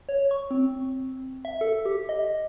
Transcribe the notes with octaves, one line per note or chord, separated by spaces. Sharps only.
C#5
C#6
C4
E5
A4
G4
D#5